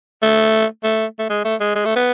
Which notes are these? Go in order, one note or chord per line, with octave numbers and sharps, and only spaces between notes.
A3
A3
A3
G#3
A3
G#3
G#3
A3
B3